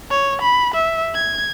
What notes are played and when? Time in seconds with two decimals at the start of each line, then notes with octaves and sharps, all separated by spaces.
0.11 C#5
0.42 B5
0.74 E5
1.14 G#6